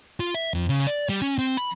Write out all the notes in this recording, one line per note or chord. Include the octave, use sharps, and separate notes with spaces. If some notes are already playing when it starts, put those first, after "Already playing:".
F4
E5
F2
C#3
D5
G3
C#4
C4
B5